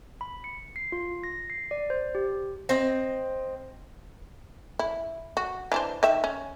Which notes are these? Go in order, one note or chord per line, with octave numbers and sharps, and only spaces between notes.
B5
C#7
C7
F4
A#6
C7
D5
C5
G4
C4 D#5
E4
F#4
E3 D4 C5
D#3 E5
C#4